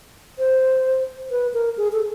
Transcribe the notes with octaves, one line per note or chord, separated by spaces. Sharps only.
C5
B4
A#4
G#4
A4